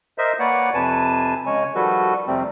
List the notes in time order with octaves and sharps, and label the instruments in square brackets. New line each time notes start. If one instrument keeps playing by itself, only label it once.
[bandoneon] A#4 C5 D#5 E5
A#3 B4 C#5 D5 F#5
F2 C3 B4 G#5 A5
C#3 G#3 C#5 G#5
D#3 F3 G3 F#4 A4 B4
F2 C3 G3 A3 C4